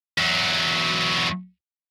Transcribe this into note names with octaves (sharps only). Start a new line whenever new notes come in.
E2 F#3